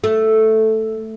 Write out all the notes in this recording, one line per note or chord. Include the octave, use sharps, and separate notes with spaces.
A3